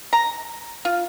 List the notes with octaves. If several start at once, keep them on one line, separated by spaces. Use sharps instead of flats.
A#5
F4